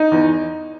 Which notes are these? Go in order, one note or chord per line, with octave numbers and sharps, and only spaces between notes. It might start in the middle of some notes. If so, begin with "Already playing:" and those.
Already playing: D#4
E2